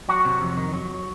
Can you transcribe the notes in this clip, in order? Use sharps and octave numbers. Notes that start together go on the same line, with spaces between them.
F#3 F#4
C3
F2
D#3
F#3